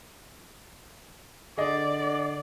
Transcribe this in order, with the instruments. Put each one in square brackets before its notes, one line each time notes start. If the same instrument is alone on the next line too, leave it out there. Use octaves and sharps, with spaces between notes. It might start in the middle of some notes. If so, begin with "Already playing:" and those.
[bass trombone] D3 [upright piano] G#4 D#5 [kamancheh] D5